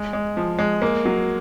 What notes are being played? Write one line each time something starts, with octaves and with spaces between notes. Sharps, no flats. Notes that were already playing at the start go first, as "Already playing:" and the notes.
Already playing: G#3
G#3
F3
G#3
A#3
F#3